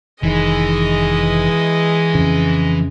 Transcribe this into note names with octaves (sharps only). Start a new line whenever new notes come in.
F1 D#3 E3 G#3 D#5
F2 C#3